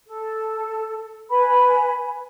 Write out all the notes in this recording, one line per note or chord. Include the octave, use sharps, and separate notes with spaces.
A4
B4 G#5 B5